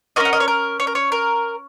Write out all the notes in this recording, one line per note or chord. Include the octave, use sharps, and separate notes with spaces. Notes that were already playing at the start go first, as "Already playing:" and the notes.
C#4 F#4 A#4 D#5
F#5
D#5
C#5
A#4
C#5
A#4
C#5
A#4